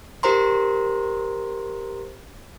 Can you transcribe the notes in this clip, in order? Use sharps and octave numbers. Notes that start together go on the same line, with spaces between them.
G4 A#4 C5 A#5 C6